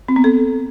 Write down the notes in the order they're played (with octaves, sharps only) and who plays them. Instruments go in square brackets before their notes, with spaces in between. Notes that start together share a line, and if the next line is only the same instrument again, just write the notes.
[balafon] C4
B3
A4